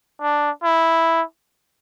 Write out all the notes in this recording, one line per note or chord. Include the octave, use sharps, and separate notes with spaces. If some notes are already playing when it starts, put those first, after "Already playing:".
D4
E4